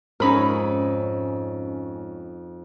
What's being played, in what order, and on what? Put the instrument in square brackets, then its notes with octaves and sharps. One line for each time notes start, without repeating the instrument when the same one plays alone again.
[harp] F2 D#4 [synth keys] G#2 C#4 [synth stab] A#4 B5